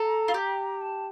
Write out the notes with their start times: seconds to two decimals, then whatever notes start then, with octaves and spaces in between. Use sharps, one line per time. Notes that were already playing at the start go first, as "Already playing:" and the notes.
Already playing: A4 A#5
0.28 F4
0.34 G4
0.81 A5